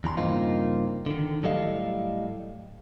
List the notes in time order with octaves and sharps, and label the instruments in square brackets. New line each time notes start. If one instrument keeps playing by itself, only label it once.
[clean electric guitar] E2 E3 A#5 C6
G2 C#3 A#3 C4 D#4 F4
D3 D#3
A2 F#3 G3 A4 D#5 F5